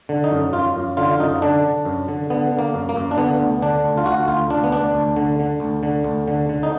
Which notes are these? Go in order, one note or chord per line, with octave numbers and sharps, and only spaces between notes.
D3
D#4
F#2
F#2 F4
F#2
D3 F4
F4
F#2 D#4
D3 D4
D3
F#2
D3
D3 B3
D3
A#3
F#2
A#3
F#2
D4
D3 B3
D2
D3 D4
D2
F4
D2 F#4
D2 F4
D2 D4
B3
D2 D4
D2
D3
D3
D2
D3
D2
D3
D3
D#4